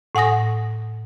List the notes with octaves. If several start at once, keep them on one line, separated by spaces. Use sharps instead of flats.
A2 F#5 G#5 D#6 A#6